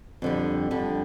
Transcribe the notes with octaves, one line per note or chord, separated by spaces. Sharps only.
F2 D3 G3
F2 D3 G3